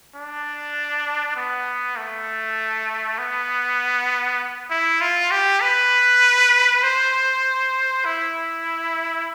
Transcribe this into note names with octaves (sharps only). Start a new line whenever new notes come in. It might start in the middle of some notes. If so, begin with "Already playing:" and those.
D4
B3
A3
B3
E4
F4
G4
B4
C5
E4